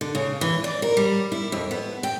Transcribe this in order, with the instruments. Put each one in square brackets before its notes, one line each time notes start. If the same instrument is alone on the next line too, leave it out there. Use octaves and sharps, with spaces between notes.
[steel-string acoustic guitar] D3
C#3
E3
D5
A#4
G3
E4
F2
B3
G5